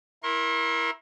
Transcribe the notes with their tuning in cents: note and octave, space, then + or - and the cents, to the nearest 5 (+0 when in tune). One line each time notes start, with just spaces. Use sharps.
E4 +0 A#4 +20 C6 +45